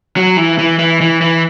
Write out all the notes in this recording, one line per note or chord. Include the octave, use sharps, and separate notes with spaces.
F#3
E3
E3
E3
E3
E3